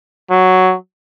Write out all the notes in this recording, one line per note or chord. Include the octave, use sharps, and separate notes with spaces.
F#3